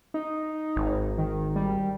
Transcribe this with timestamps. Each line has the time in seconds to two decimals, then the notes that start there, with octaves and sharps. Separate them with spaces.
0.14 D#4
0.76 G#1
1.18 D#3
1.56 G3